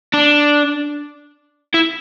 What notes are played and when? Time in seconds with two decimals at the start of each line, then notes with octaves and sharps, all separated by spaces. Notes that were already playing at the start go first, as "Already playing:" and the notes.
0.13 D4
1.74 E4